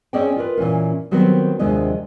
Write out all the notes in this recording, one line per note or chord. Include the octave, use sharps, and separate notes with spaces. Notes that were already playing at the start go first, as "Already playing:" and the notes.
C4 C#4 G#4 D5 D#5 G5
F4 A#4 B4
A#2 E3 C#4 F4
D#3 F#3 G3 B3 C4
D#2 C3 F3 G#3 D4 D#5